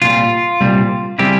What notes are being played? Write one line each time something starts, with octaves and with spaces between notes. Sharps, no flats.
C2 A#2 G3 F4
C2 A#2 G3
C#3 G3 C4 E4 G4